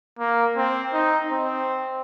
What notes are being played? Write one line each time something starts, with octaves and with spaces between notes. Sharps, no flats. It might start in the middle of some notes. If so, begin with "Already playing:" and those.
A#3
C4
D#4
C4